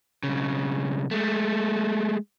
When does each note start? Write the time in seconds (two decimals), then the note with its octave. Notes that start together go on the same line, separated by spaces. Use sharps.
0.23 B1 C#3
1.11 G#3 A3